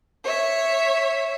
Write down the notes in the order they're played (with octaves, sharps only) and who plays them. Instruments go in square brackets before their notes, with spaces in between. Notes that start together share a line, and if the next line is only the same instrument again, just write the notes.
[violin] C#5 E5